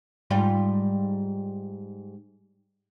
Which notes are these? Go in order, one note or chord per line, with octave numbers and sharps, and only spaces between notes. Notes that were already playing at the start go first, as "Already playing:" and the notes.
G#2 G3 F4